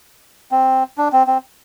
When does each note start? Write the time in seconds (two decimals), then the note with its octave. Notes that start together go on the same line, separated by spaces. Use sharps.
0.52 C4
0.98 D4
1.13 C4
1.27 C4